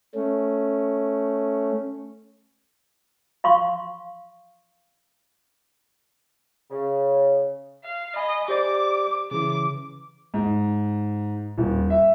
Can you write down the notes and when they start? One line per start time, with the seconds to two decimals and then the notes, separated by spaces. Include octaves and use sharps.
0.15 A3 C#4
3.44 F5 C6 C#6
6.71 C#3
7.84 F5
8.16 D#5 G#5 B5
8.48 G4 C5 D5 D6
9.31 C#3 E3 D6
10.34 G#2
11.58 D#1
11.90 E5